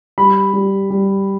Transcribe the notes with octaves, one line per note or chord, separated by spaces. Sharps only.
G3 B5
G3
G3